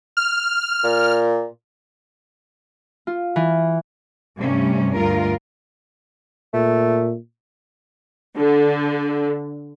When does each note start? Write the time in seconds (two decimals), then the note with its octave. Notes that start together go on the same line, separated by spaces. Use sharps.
0.17 F6
0.84 A#2
3.07 F4
3.36 E3
4.37 G2 C3 G3 A3 C#4
4.96 D2 G2 F4 A#4
6.54 A#2 A3
8.36 D3